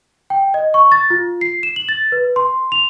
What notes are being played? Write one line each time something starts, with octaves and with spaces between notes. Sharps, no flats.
G5
D#5
C#6
A6
F4
C7
E7
F#7
A6
B4
C6
F7